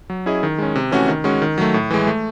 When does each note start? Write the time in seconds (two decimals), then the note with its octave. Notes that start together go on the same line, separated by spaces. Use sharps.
0.10 F#3
0.26 C#4 E4 G#4 D#5
0.43 D#3
0.58 G#3 C#4
0.76 C3
0.91 E3 A3 C#4 F#4
1.08 D#3
1.24 G#3 C#4 F#4
1.42 D#3
1.58 F#3 A3
1.74 A2
1.91 E3 G#3
2.07 A3